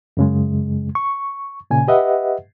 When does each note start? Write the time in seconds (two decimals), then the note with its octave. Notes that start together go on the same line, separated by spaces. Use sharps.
0.17 F#2 C#3 G#3
0.95 C#6
1.70 A#2 C#3 G#5
1.88 G4 B4 D#5 E5 F#5